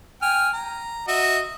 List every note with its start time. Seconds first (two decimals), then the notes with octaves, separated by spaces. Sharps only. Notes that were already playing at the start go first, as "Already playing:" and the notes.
0.22 G5 G#5 F6
0.53 A#5
1.08 F#4 D#5 E5